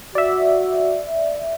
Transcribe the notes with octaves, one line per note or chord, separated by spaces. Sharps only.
F#4 D5 E5